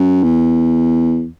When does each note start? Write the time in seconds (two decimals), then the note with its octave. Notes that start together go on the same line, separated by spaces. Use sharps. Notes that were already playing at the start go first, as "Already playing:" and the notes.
Already playing: F#2
0.23 E2